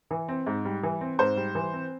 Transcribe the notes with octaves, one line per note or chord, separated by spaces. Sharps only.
E3
C4
G#2
G3
E3
C4
G#2 C5
G3
E3
C4